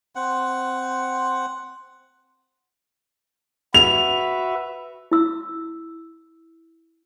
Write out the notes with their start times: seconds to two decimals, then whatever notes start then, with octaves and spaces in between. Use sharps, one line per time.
0.16 C4 F#5
3.74 F#4 B4 E5 F7
5.12 E4 E6